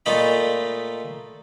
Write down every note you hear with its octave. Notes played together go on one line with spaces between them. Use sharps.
A#2 A3 D#4 B5